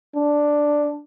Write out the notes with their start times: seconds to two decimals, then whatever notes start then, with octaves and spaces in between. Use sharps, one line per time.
0.16 D4